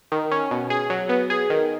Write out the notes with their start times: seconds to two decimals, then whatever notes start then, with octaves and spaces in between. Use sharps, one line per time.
0.12 D#3
0.31 C#4
0.51 B2
0.70 G#4
0.90 F#3
1.09 B3
1.30 G#4
1.50 D#3